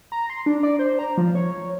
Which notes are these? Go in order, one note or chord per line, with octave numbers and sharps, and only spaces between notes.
A#5
C6
D4
D5
C5
A#5
F3
C#5